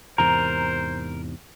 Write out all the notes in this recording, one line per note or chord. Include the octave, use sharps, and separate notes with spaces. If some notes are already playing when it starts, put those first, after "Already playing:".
E2 G#2 C3 A#4 C5 A#5